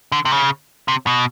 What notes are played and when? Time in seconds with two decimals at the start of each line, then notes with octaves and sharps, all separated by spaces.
0.12 D3
0.25 C3
0.32 C#3
0.88 C3
1.07 B2